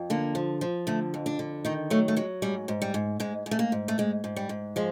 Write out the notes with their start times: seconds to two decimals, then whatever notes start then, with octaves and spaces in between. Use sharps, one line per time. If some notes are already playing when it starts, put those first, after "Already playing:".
Already playing: F2
0.10 D3 A#3
0.35 F3
0.61 F3
0.87 D3 A3
1.14 F2
1.26 D4
1.39 D3
1.65 D#3 D#4
1.90 F#3 A3
2.08 A3
2.17 F#3 G#3
2.42 G#2 G3
2.68 G#2
2.82 G3
2.94 G#2
3.20 G#2 G#3
3.46 G#2
3.51 A3
3.59 A#3
3.72 G#2
3.88 A3
3.98 G#2 G#3
4.24 G#2
4.36 G3
4.49 G#2
4.76 F3 G#3